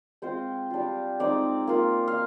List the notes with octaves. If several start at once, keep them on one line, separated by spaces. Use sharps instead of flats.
G#3 C4 F4 C5
G3 D4 F4
G#3 C4 D#4 D5
A#3 F4
F5